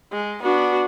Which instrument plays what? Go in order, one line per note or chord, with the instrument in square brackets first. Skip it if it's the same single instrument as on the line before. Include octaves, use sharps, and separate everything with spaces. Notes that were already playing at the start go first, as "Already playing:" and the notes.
[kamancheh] G#3
[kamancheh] B3 D4 [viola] F#4